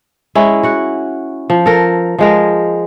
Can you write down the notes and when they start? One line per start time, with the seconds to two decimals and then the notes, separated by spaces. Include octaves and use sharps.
0.35 G#3 C#4 E4
0.63 F#4 F#5
1.50 F3
1.66 A4 A#4
2.18 F3 G#3 A#4